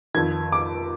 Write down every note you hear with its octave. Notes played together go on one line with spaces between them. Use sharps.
F2 D#3 G#6
D6